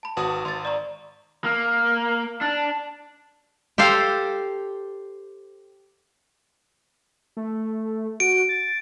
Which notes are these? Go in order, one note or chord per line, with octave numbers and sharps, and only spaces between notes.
A5 B5
G#1 F#4 B4 D#6
G#1 C6 A6
D5 A#5 C#6
A#3
D4
G4 A4 C5 F5 G5
A3
F#4 D7
A6